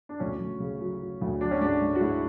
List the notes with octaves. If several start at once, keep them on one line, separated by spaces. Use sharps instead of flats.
D4
D2 C#4
D2
C#3
F#3
F#3
D2
F#3 D4
C#4
G#2 D4
G#2
F#4
G#2 E4